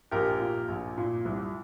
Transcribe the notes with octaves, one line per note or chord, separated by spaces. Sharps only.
A#1 G4 A#4
A#2
A#1
A#2
C2